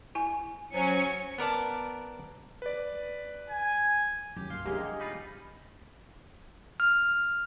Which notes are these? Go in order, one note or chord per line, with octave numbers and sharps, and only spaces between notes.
E4 G#5
F#3 C#4 C5 G#5 C#7
B3 A#4 D5 A5
B4 D5
G#5
F#2 G4
D#3 A#3 F5 C6
F#2 G#3 A#3 D4 G4 G#4 D#5
C#5
G3 D#4 F4 B5
F6